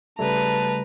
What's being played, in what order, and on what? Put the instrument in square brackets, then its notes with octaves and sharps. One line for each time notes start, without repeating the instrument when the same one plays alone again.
[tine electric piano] C#3 G3 A3 [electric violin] B4 A#5 [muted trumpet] A5